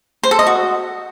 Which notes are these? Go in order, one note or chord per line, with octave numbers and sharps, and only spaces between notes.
C5
A4
D#5
F#4